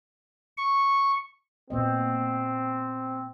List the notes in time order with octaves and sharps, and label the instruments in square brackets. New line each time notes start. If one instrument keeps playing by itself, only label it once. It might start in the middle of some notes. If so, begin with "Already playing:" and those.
[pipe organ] C#6
[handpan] A#2 B3 D#5 [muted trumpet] C4